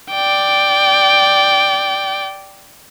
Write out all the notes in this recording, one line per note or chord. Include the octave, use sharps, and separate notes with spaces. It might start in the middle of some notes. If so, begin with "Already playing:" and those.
D5 G5